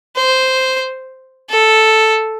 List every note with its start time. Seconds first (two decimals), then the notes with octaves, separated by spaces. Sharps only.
0.17 C5
1.50 A4